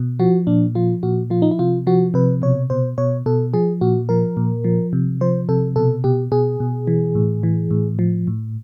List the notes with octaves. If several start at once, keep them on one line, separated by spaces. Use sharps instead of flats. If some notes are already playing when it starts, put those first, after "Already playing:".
Already playing: B2
F3 F#4
A#2 D4
F3 F4
A#2 F#4
F3 F4
D#4
E4
C3 F4
F3 F#4
C3 B4
B2 C#5
B2 C5
B2 C#5
B2 A4
F3 G#4
A#2 F#4
F3 A#4
A#2
F3
C3
F3 C5
C3 A4
B2 A4
B2 G4
B2 G#4
B2
E3
A2
E3
A2
F3
A2